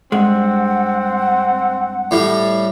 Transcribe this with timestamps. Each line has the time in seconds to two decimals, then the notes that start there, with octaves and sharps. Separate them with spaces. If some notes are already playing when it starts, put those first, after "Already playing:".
0.12 G2 G#3 C4 F#5
2.11 A2 G3